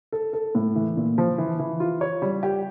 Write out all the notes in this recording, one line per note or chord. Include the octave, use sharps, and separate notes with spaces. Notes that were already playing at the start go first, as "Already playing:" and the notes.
A4
A4
A2
E3
A#2
F3
E3
E3
F4
C#5
G3
G4